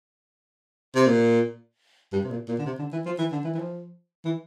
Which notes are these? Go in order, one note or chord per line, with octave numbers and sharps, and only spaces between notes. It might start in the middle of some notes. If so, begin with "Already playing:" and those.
C3
A#2
G2
C3
A#2
A#2
D3
C3
D3
E3
F3
E3
D3
E3
E3
F3
E3